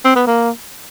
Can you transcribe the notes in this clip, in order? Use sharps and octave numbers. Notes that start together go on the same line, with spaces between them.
C4
B3
A#3